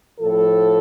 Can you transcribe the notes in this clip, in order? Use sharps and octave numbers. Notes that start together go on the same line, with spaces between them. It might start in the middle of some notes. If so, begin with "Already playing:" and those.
A2 F3 A4